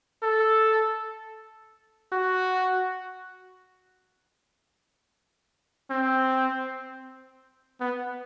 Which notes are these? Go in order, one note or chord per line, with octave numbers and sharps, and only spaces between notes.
A4
F#4
C4
B3